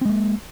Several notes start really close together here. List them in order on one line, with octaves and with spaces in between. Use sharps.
C4 G#3 A#3